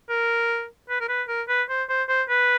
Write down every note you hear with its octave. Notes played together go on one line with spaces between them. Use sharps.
A#4
B4
A#4
B4
A#4
B4
C5
C5
C5
B4